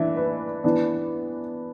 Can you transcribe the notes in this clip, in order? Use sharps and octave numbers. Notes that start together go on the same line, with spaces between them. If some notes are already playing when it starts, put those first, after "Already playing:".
Already playing: E3 D4 E5
B4
E3 B3 D4